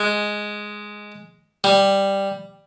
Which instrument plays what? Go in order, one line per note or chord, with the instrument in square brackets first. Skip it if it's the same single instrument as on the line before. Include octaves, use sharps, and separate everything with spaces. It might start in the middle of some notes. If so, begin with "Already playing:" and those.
Already playing: [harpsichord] G#3
G3